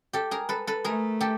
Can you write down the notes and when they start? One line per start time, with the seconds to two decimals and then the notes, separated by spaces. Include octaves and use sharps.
0.13 G4 A4
0.31 G#4 A#4
0.49 A4 B4
0.67 A4 B4
0.84 A3 G#4 A#4
1.21 G4 A4